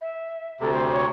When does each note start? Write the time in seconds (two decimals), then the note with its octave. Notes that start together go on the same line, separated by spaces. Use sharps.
0.01 E5
0.60 D2 C3 A4
0.72 C5
0.91 C#5